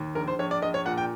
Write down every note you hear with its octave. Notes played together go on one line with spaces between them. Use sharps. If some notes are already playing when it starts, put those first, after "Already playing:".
Already playing: D#2
A#1 A#4
C5
A#1 C#5
D5
A#1 D#5
C#5
A#2 F#5
G5